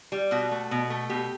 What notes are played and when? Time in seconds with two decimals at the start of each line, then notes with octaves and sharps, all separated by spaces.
0.12 G3
0.31 B2 F#4
0.51 A3
0.71 B2
0.90 A3
1.09 B2 G4